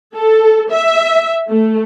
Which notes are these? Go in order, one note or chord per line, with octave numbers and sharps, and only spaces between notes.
A4
E5
A3